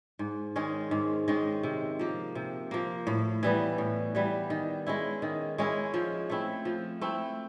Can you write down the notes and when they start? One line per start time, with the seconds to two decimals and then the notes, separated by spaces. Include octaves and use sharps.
0.19 G#2
0.56 D#3 G#3 C#4
0.91 G#2
1.28 D#3 G#3 C#4
1.63 C3
1.99 F3 A#3
2.35 C3
2.71 F3 A#3
3.07 A2
3.43 E3 G3 B3
3.78 A2
4.15 E3 G3 B3
4.50 D#3
4.87 G#3 C#4 E4
5.22 D#3
5.58 G#3 C#4 E4
5.94 F3
6.30 A3 C4 E4
6.65 F3
7.01 A3 C4 E4